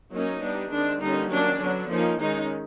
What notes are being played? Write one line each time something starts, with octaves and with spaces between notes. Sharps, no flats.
F#3 A#3 C#4 D#4
G3 B3 D4
D#3 G#3 C4 D4
D3 G3 A#3 C#4 D#4
D#3 F#3 A#3 C#4 D4
D3 F#3 B3 D4
F3 A#3 C#4 D#4
D#3 G#3 C#4 D#4